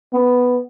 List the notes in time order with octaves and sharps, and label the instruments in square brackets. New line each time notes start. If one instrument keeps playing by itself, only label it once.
[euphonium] B3